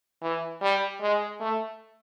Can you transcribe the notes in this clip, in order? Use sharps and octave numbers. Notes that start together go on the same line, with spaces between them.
E3
G3
G#3
A3